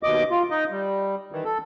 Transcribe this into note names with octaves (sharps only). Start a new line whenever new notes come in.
D#2 B2 D#5 D6
F4
D#4 D#5
G3
D#3 E3
A4